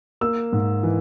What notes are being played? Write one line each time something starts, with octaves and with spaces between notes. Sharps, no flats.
A#3 E6
G#2
E3